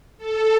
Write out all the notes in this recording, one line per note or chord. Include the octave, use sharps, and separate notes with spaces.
A4